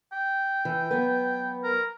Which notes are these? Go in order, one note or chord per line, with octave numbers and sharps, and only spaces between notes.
G5
E3
F#3 B3 B4
A#4